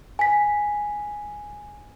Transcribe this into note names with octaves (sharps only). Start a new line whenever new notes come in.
G#5 B6